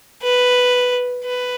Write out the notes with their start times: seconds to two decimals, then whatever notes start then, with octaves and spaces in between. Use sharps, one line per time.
0.23 B4
1.25 B4